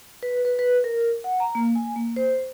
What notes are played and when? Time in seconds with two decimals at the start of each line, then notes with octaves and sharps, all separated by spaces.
0.23 B4
0.45 B4
0.59 B4
0.84 A#4
1.24 F#5
1.40 A#5
1.55 A#3
1.76 G#5
1.96 A#3
2.16 C5